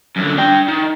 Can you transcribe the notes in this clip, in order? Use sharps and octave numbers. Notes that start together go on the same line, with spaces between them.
F#2 D3
D4 G5
D#3